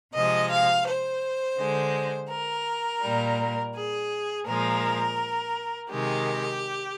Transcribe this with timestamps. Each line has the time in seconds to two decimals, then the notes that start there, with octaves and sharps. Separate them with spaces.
0.14 C3 F3 G#3 D#5
0.50 F5
0.86 C5
1.58 D3 G#3
2.29 A#4
3.02 A#2 G3
3.74 G#4
4.46 A#2 F3 G#3 A#4
5.90 C3 D#3 G#3 G4